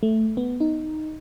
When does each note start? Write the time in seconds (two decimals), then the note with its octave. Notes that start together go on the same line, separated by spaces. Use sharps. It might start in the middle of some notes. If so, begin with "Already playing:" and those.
0.03 A3
0.37 B3
0.60 D#4